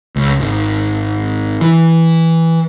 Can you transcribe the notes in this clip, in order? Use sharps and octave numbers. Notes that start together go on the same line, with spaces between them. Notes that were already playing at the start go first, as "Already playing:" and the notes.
C#2
G#1
E3